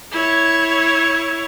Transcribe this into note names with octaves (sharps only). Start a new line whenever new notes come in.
E4 C#5